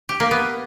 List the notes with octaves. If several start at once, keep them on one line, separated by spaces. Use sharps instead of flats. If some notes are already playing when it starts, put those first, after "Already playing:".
G4
A#3
B3